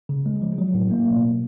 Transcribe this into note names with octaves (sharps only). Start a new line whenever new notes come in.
C#3
G#3
F3
F#3
A2
A#3
B2